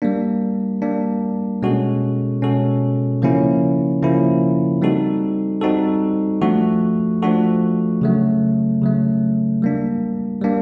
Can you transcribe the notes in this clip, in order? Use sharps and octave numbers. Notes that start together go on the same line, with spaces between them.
G3 A#3 D4
G3 A#3 D4
B2 G#3 C#4 F#4 A4
B2 G#3 C#4 F#4 A4
C#3 F3 A#3 C#4 E4
C#3 F3 A#3 C#4 E4
G3 C4 D#4 F#4 A4
G3 C4 D#4 F#4 A4
F3 A3 D4 F#4 A4
F3 A3 D4 F#4 A4
C#3 F#3 A3
C#3 F#3 A3
G3 A#3 D4
G3 A#3 D4